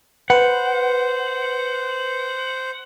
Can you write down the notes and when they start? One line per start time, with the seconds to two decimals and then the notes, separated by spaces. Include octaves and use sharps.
0.30 B4 C5 F#5